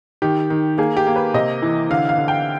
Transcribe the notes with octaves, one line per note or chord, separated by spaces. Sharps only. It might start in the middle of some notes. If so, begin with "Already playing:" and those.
D#3 G4
D#3
A#3 G#4
G4
A#3
B4
C3 D#5
E3
D3 F5
F5
D3
G5